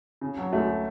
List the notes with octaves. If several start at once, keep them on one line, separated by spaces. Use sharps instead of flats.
C#3
F#3
C#2 A3